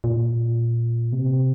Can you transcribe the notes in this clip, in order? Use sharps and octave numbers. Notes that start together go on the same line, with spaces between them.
A#2
C3